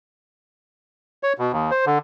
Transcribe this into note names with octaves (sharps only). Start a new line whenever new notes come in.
C#5
B2
D#2
C5
D3